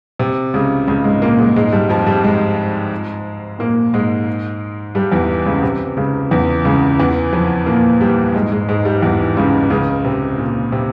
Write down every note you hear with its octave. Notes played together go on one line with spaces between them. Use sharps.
C3
C#2 C#3
C#2 C#3
G#2 G#3
A#2 A#3
G#2 G#3
G#2 G#3
G2 G3
F2 F3
G2 G3
G#2 G#3
A#2 A#3
G#2 G#3
G2 G3
E2 E3
C#2 C#3
C3
C#2 C#3
E2 E3
C#2 C#3
E2 E3
F2 F3
A#2 A#3
G2 G3
G#2 G#3
G#2 G#3
G#2 G#3
G2 G3
E2 E3
C#2 C#3
C#2 C#3
C3
A#2
C3